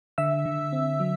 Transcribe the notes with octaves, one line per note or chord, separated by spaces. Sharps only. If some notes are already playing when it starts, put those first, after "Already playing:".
D3 E5 E6
D3
C4
F#3